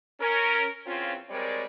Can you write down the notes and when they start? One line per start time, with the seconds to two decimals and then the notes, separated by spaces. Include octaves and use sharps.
0.20 C#4 A#4
0.86 E2 C4 C#4 F4
1.29 G3 G#3 C4 A#4 C#5 D5